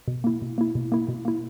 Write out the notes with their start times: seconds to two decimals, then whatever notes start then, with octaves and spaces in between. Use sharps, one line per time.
0.08 B2
0.24 A#3 E4
0.42 B2
0.58 A#3 E4
0.75 B2
0.92 A#3 E4
1.08 B2
1.25 A#3 E4